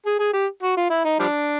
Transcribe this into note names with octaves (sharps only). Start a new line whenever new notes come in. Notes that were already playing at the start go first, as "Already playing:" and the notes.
G#4
G#4
G4
F#4
F4
E4
D#4
F3 G3 D4